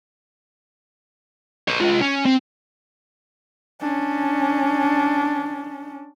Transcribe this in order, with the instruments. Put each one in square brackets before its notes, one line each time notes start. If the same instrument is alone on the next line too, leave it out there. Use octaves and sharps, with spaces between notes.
[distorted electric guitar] B4 C#5
G#3 F4
C#4
C4
[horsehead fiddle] C#4 D4